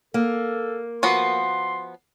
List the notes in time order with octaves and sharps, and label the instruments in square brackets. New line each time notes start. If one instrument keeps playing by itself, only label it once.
[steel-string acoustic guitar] A#3 [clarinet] A4
[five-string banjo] F3 B3 F#4 [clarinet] C6